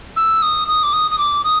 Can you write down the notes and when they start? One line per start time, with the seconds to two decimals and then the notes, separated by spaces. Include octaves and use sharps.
0.16 E6
0.42 D#6
0.68 D#6
0.83 D6
0.93 D#6
1.11 D#6
1.18 D6
1.44 D#6